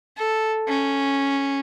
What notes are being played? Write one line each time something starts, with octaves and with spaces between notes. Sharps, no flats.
A4
C#4